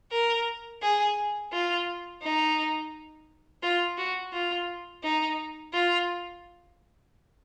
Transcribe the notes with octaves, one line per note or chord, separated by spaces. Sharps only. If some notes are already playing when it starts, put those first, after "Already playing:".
A#4
G#4
F4
D#4
F4
F#4
F4
D#4
F4